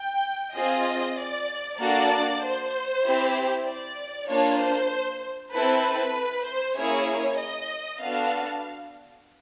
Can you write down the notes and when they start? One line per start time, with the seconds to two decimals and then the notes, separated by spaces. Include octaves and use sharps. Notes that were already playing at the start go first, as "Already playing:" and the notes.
Already playing: G5
0.55 C4 F4 G#4 D#5
1.18 D5
1.79 A#3 D4 F#4 A4 D5
2.42 C5
3.05 C4 E4 G4
3.66 D5
4.28 A#3 D4 F4 C#5
4.60 C5
5.53 C4 E4 A4 B4
6.46 C5
6.77 A#3 C#4 E4 G#4 C#5
7.39 D#5
8.02 B3 D4 F#4 A4 F5